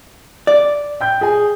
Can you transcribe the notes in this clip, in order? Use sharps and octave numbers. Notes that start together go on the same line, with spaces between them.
D5
G5 G6
G#4 G#5